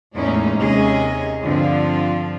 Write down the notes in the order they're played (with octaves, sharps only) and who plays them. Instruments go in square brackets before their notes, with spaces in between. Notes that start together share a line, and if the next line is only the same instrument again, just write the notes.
[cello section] E2 A2 G#3 A#3 C#4 D#4
D#2 C3 G#3 C#4 G#4 D#5
G2 D3 F3 C4 F4